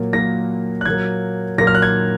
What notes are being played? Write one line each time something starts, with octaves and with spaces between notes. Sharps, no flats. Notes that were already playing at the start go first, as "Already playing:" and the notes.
Already playing: A#2 F#3 A#3
A#2 F#3 A#3 A#6
F#6
A#2 F#3 A#3 G#6
A#2 F#3 A#3 A#6
F6
F#6
G#6